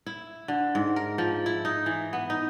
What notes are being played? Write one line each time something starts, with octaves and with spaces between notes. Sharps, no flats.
E4
D3
G#2
A#4
F3
E4
D#4
E3
B3
D#4